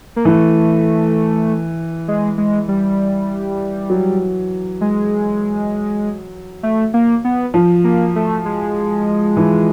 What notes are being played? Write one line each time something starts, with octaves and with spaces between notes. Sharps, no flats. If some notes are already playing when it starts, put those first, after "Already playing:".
A#3
E3 A3
G#3
G#3
G3
F#3
G#3
A3
A#3
B3
F3
A#3
A3
G#3
E3